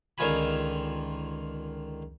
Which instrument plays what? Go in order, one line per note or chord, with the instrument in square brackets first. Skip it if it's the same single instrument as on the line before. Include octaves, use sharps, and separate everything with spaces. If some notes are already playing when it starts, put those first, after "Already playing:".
[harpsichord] C#2 D3 D#3 F4 G#5 B5